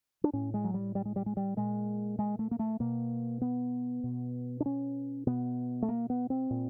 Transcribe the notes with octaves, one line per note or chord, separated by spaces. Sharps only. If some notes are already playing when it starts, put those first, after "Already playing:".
D4
A2 C#4
G#3
F#3
G3
G3
G#3
G3
G#3
G3
A#2 G#3
G#3
A3
A#3
A3
B2 A#3
B3
B2
D4
C#4
B2 B3
A3
A#3
B3
C4
A#2